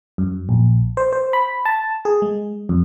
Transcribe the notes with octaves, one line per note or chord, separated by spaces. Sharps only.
F#2
A#1
C5
C5
B5
A5
G#4
G#3
F2